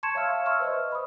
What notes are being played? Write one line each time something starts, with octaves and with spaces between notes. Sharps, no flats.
A5 C6 C#6 G#6 C#7 E7
C#5 E5 F5 A5 E6 F6
E5 C6 C#6 E6 F6
B4 C5 D#5
B5 D#6